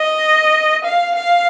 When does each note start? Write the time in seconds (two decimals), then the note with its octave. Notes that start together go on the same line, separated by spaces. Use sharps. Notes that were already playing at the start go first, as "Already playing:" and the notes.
Already playing: D#5
0.85 F5
1.15 F5